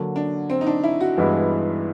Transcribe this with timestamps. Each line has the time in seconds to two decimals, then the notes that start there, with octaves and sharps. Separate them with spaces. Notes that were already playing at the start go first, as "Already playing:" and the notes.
Already playing: D3 F#3 A#3
0.16 D4
0.50 C4
0.61 D#4
0.66 D4
0.84 E4
1.01 F#4
1.17 G2 E3 G#3 B3 E4